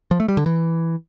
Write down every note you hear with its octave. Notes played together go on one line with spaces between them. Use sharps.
F3
A3
G3
D3
E3